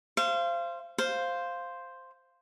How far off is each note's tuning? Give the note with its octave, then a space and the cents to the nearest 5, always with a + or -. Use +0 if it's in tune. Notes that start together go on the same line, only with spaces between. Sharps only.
C5 +0 F5 -30
C5 +0 F5 +0